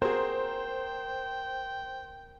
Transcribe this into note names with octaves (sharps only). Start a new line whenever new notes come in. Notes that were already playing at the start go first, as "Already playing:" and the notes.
C4 F#4 G#4 A#4 C5 G5